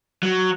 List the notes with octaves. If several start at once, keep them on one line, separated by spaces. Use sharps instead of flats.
F#3